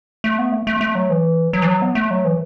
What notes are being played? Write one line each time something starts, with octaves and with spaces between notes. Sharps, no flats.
A3
B3
A3
A3
A3
F#3
E3
F#3
E3
F#3
B3
A3
F#3
E3